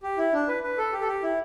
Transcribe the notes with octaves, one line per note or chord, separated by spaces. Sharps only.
G4
E4
D4
B4
B4
A4
G4
A4
G4
E4